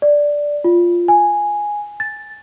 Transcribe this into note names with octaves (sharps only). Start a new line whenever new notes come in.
D5
F4
G#5
A6